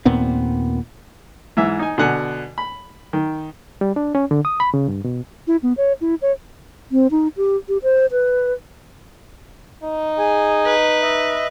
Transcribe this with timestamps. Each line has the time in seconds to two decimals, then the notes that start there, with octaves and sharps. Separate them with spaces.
0.05 D#2 A#2 B3 C4
1.57 G#2 E3 E5
1.79 D#4 G#5
1.98 B2 D3 F#5 G#5
2.58 B5
3.13 D#3
3.81 G3
3.96 D4
4.15 C#4
4.31 D3
4.45 D#6
4.60 B5
4.74 C#3
4.88 G2
5.04 B2
5.47 E4
5.63 B3
5.77 C#5
6.01 E4
6.22 C#5
6.92 C4
7.11 D#4
7.37 G4
7.69 G4
7.83 C5
8.11 B4
9.84 D#4
10.19 G#4 G#5
10.66 B4
11.02 D#5 E5